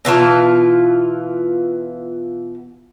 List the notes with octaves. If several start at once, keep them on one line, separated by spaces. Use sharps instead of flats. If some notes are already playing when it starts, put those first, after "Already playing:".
B2 E3 F4 A5